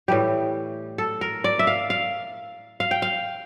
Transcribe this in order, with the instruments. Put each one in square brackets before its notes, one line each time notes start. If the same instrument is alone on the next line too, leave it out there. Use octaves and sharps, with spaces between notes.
[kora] A2 E3 G3 G4
A4
A#4
D5
E5
F5
F5
F5
G5
F5